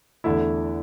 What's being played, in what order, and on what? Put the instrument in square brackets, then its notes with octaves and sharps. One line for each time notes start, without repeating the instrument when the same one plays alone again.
[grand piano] E2 D3 A3 E4